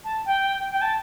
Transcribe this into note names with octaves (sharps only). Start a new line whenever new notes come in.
A5
G5
G5
A5